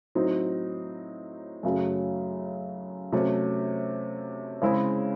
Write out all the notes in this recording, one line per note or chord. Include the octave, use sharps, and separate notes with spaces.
A2 F#3 C4 D#4
F#2 C#3 F#3 A3 C#4
C3 F#3 A3 C#4
C#3 G#3 C4 E4